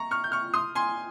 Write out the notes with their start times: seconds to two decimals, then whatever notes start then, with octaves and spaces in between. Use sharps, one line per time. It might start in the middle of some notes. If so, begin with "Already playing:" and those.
Already playing: A#5 C#6
0.11 C#6 F6
0.24 G6
0.32 C#6 F6
0.54 C6 D#6
0.75 G#5 C6